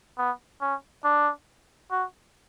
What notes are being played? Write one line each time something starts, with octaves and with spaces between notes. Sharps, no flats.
B3
C#4
D4
F#4